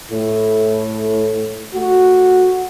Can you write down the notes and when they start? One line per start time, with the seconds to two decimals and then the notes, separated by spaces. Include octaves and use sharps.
0.11 A2
1.74 A3 F#4